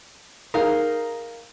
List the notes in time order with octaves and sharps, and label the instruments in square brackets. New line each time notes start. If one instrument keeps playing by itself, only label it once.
[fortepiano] D#4 G#4 [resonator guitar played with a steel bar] A#4 F5